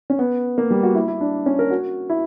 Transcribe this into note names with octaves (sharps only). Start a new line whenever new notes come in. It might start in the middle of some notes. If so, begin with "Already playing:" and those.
C#4
B3
A#3
G3
F#4
E4
E4
D4
C#4
A#4
F#4
E4